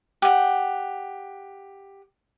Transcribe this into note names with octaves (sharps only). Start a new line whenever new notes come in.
G4 F#5